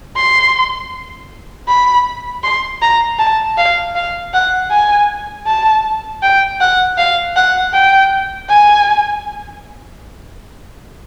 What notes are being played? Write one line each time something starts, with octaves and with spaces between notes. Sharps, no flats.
C6
B5
C6
A#5
A5
F5
F5
F#5
G#5
A5
G5
F#5
F5
F#5
G5
G#5